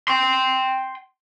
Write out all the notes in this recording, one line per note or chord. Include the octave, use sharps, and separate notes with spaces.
G5 C6